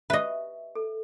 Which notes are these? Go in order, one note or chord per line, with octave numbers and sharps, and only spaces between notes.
G4 B4 D#5 E5
A4